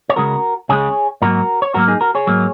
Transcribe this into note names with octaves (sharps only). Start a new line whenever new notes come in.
C#5
C#2 C#3 G#3 F#4 A#4
C#2 C#3 G#3 G#4 C#5
G#2 F#3 A#3 F#4 A#4
C#5
G#2 F#3 A#3 F#4 A#4
D#4 G#4
F#4 A#4
G#4 C#5
G#2 F#3 A#3